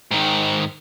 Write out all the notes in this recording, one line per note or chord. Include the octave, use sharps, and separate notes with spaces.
G#2 D#3